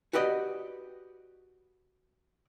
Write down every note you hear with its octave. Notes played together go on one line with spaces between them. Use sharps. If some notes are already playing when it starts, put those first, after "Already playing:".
F#4 G4 B4 D5 D#5